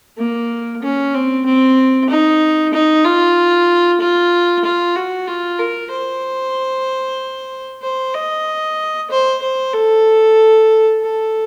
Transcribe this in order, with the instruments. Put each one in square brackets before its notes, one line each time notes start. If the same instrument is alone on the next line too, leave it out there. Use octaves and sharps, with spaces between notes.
[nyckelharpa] A#3
C#4
C4
C4
D#4
D#4
F4
F4
F4
F#4
F4
A#4
C5
C5
D#5
C5
C5
A4
A4